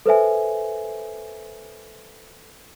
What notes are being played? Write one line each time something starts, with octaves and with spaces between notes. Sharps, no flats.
A4 B4 C5 E5 G#5